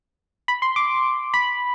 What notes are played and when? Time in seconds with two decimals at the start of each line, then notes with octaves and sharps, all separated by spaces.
0.48 B5
0.62 C6
0.76 D6
1.34 B5